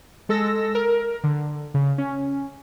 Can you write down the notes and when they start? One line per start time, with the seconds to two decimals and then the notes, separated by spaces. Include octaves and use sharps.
0.29 G#3 A4 E6 A#6
0.75 A#4
1.24 D3
1.74 C#3
1.98 C#4